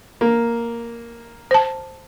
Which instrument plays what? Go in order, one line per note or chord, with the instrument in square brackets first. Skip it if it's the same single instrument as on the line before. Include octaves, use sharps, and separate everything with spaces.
[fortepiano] A#3
[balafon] C5 A5